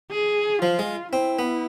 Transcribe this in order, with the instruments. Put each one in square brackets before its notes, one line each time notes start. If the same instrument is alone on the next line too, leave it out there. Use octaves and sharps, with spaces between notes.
[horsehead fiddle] G#4
[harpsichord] F3 [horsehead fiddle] F4
[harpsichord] G#3
[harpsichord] C4 [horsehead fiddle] E4
[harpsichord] B3